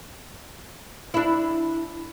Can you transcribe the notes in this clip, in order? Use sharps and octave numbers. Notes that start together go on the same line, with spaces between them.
D4 E4